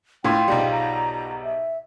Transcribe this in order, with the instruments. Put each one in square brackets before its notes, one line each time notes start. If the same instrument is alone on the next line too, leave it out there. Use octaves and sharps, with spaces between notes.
[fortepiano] A2 [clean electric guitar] F4 [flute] G5
[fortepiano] B1 G#2 G3
[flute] A#5
E5